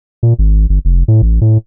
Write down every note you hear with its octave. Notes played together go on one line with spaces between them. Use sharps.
A#2
G#1
G1
F1
A2
A1
A2